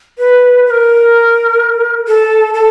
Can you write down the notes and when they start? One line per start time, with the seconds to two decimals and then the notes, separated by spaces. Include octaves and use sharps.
0.18 B4
0.67 B4
0.71 A#4
2.08 A4
2.54 A4